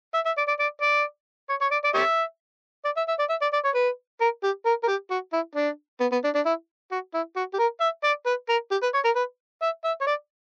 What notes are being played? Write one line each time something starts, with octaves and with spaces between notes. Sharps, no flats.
E5
E5
D5
D5
D5
D5
C#5
C#5
D5
D5
G4 C#5 E5
D5
E5
E5
D5
E5
D5
D5
C#5
B4
A#4
G4
A#4
A#4
G4
F#4
E4
D4
B3
B3
D4
D4
E4
F#4
E4
F#4
G4
A#4
E5
D5
B4
A#4
G4
B4
C#5
A#4
B4
E5
E5
C#5
D5